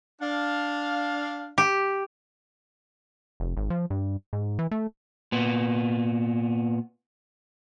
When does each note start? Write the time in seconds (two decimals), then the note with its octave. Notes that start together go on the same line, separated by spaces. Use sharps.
0.22 D4 F5
1.58 G4
3.40 F1
3.57 G#1
3.70 F3
3.90 G2
4.33 G#2
4.59 E3
4.71 A3
5.32 A#2 B3